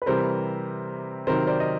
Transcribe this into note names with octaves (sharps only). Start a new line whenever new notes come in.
B4
C3 E3 G3 A#4 C5
C3 D#3 F#3 A#4 C5
C5 D5
D#5